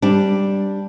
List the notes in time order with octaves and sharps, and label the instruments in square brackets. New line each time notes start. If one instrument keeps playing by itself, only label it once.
[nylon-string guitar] G3 D4